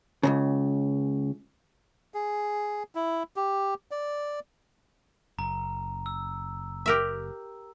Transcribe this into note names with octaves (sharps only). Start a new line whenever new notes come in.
C#2 G#2 C#3
G#4
E4
G4
D5
F#1 A#5
E6
G4 A#4 E5